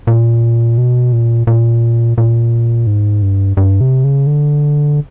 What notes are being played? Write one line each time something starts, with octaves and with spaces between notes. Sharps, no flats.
A#2
B2
A#2
A#2
A#2
G#2
G2
G2
C3
C#3
D3